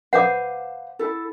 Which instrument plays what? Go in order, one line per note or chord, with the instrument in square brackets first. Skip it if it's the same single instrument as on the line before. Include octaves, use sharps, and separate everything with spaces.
[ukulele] B4 C5 F5 [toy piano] F#5 D6
[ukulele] E4 A4